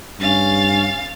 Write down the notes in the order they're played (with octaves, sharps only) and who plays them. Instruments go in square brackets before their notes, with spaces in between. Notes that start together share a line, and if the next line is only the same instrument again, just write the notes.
[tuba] G2 [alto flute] C#4 [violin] F5 A6